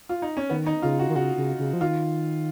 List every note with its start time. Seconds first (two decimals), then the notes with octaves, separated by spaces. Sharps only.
0.09 F4
0.22 D#4
0.37 C#4
0.50 D#3 B3
0.66 D#4
0.82 C#3 F4
0.99 F#4
1.09 D#3
1.16 C#3 F#4
1.37 C#3
1.59 C#3
1.73 F3
1.81 D#3 F4